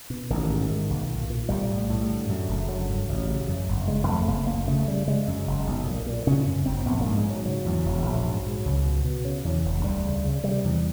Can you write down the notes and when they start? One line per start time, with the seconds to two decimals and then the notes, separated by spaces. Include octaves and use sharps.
0.10 B2
0.30 A1 D#3
0.50 G#2
0.70 G#2
0.90 B1
1.09 A#2
1.30 A#2
1.49 B1 G3
1.70 A2
1.90 A2
2.09 D3
2.29 F#2
2.48 F#1
2.69 D3 F#3
2.89 G2
3.08 A1
3.28 C#3
3.49 F#2
3.68 G1
3.88 C#3 G#3
4.07 F2 A3
4.28 F#1 A#3
4.47 D2 A#3
4.67 C#3 A3
4.88 C#3 G3
5.07 C#3 G#3
5.27 F#2
5.47 F#1
5.67 B1
5.86 A#2
6.07 A#2
6.27 C#3 C#4
6.46 F#2
6.66 G1 C4
6.86 A#1 B3
7.01 G#2 A#3
7.16 G#3
7.26 G#2 F#3
7.46 C#3 F#3
7.65 E2
7.85 E1
8.05 A#1
8.26 G#2
8.45 G#2
8.65 C#2
8.85 B2
9.04 B2
9.25 C#3
9.44 E2
9.65 E1
9.84 D2 G3
10.05 C#3
10.24 C#3
10.43 C3 G3
10.64 E2